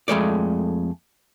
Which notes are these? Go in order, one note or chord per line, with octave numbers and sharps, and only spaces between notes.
F2 G#3 A3 D5